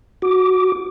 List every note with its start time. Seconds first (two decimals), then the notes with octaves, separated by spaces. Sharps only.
0.22 F#4 D6